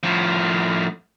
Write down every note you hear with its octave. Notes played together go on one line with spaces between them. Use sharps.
A2 F3